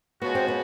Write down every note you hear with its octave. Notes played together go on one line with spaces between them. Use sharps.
F3 G#3 B3 C#4 F#4
C4
B3